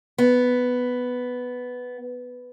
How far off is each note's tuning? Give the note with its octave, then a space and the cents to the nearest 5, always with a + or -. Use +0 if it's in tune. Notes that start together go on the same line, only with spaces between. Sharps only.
B3 +5